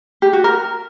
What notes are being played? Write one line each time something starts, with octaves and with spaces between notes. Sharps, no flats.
G4
F#4
A#4